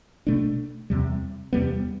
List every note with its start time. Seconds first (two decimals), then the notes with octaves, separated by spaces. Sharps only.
0.27 B2 A3 D4
0.90 E2 C3 G3
1.53 E2 C3 G3 B3